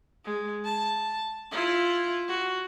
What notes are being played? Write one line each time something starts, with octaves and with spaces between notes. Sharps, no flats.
G#3
A5
E4 F4
F#4